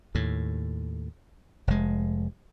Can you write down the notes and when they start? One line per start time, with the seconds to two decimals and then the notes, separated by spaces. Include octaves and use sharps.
0.15 D#2 A2
1.67 F1 G#3